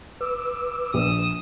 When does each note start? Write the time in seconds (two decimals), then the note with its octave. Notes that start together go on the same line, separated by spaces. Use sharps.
0.21 B4 D6 E6
0.94 A#1 D#6 E7